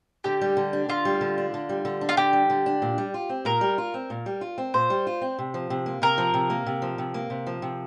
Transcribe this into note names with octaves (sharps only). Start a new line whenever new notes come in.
D3 G4
G3
D3
D4
D3 F4
G3
D3
D4
D3
G3
D3
D4
F4
D3 G4
G3
D3
D4
A#2
G3
F4
C4
A#2 A#4
G3
F4
C4
A#2
G3
F4
C4
A#2 C5
G3
F4
C4
C3
F3
C3
A#3
C3 A#4
F3
C3
A#3
C3
F3
C3
A#3
C3
F3
C3